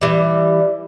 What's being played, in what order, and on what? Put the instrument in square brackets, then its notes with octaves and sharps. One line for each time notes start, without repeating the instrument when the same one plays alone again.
[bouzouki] E3 G3